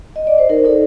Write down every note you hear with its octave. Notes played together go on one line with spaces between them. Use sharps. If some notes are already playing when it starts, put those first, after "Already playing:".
D#5
D5
C5
D#4 A#4
D#4 A4